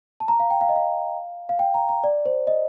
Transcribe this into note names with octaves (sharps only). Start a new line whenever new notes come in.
A5
A#5
F5
G5
F5
D#5
F5
F5
G5
A#5
A#5
D5
C5
D#5